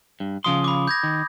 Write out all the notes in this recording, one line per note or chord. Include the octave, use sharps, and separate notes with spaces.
G2
C#3 F3 C6 D#6
B5 D6
G6 G#6 A#6
D#3